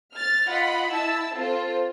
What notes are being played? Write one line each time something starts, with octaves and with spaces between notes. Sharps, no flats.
F6 A6
F4 D#5 F#5 B5
E4 A5 E6
C4 F4 A4 C5